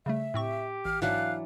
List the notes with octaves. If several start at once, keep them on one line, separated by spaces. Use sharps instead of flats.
C#3 G3 A3 E5
A2 C4 G4 C#6
A1 F6
G#2 E3 F#3 D4 F5 F#6